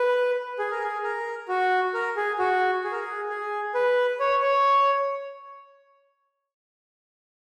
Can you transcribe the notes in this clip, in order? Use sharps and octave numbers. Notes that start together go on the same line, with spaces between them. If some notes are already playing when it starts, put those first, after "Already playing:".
Already playing: B4
G#4
A#4
G#4
A#4
F#4
A#4
G#4
F#4
G#4
A#4
G#4
G#4
B4
C#5
C#5